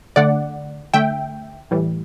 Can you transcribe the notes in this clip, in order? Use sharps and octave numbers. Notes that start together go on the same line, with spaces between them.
D3 A3 D5 F#5
D3 A3 E5 G5
A2 E3 G3